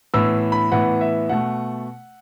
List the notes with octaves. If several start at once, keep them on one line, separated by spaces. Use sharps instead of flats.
A2 E3 B3 E6
B5
A2 E3 B3 F#5
E5
B2 A3 F#5